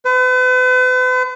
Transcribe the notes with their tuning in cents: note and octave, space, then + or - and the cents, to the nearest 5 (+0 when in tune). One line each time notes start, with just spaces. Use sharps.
B4 +45